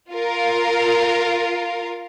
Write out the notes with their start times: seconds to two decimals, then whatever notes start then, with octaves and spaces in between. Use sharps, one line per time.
0.10 F4 A#4 F5